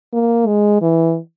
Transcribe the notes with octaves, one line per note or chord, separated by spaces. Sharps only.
A#3
G#3
E3